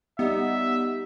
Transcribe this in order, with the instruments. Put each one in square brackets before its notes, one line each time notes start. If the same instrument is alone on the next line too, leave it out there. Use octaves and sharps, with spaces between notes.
[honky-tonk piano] G3 D#4 [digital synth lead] B3 [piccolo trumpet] E5